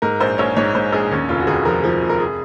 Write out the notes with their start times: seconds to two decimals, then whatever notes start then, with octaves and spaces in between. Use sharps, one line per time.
0.02 G#2 A#4
0.20 A#1 C5
0.38 A#1 C#5
0.56 G#2 C#5
0.75 G#2 C5
0.93 A#1 G#4
1.11 D#2 C#4
1.29 F1 F4
1.40 F#4
1.47 D#2 G#4
1.65 F3 A#4
1.84 F3
2.02 F1
2.10 A#4
2.20 G#4